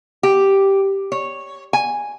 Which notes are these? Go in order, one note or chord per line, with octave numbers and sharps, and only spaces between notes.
G4
C#5
G#5